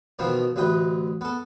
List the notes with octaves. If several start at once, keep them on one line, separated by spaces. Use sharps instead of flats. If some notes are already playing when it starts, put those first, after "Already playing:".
B2 D#3 F3 A#3 B3
A1 D2 B4 D#5 G5
B3 A4